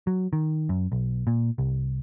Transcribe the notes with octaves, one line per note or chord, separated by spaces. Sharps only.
F#3
D#3
F#2
B1
A#2
C2